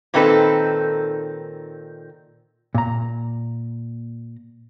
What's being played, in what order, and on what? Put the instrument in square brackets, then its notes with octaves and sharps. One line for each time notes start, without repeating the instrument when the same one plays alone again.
[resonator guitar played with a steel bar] A#2 D#3 C4 D#4 A4 B4
[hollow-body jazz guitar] A#2 A#5